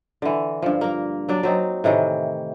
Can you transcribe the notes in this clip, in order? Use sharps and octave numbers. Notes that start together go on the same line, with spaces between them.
D3 E3
G2 F3
A#3 A#4
F#3 D4 D5
F#3 C4 D#4
A2 C3 D#3 E3